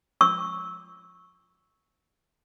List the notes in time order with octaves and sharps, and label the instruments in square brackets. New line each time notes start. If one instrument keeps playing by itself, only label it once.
[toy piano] C#6 E6